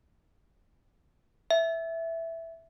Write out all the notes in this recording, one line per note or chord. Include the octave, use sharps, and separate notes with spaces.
E5